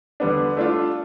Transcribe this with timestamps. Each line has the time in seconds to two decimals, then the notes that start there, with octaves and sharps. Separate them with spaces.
0.20 D3 G3 B3 D4
0.57 A3 D4 F4